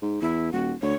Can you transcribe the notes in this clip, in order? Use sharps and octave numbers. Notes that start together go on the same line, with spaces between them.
G#2
E2 E4
D#1 F#4
D2 C#5